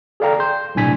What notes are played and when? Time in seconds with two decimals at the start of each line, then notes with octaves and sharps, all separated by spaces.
0.20 G#4 A4 D5 F5 G5 A#5
0.40 C6 G6
0.75 B1 A2 C3 D4 G#5 B6